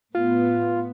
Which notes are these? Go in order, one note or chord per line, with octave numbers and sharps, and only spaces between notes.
A2 B3 F4